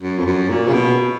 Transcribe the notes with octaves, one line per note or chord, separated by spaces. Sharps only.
F#2
F2
F#2
A#2
C#3
B2